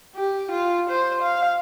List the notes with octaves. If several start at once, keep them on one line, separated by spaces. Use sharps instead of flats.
G4
F4
C5
F5